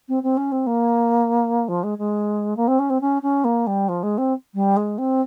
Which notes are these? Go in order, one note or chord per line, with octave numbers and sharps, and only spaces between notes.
C4
C4
C#4
C4
A#3
F3
G#3
G#3
A#3
C4
C#4
C4
C#4
C#4
A#3
G3
F3
G#3
C4
G3
G#3
C4